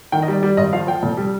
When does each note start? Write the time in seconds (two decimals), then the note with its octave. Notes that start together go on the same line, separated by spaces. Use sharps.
0.12 D#3 G5
0.22 D#5
0.28 G3 D5
0.43 G3 D5
0.57 G#1 D#5
0.73 F3 F5
0.87 F3 G5
1.03 F1
1.17 G3